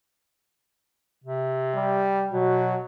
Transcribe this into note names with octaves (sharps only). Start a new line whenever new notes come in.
C3
G3
B2 F#3